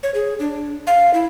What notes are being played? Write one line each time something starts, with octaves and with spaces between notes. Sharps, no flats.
C#5
G#4
D4
F5
E4